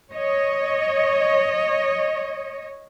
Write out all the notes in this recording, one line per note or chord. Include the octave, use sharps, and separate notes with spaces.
C#5 D#5